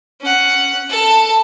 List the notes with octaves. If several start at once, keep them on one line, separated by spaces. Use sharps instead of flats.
C#4 F#5
A4 A5